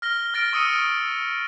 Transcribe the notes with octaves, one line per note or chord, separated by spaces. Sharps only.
F6 A#6 G7
F6 A6 A#6 D7
C#6 D#6 E6 C#7 D#7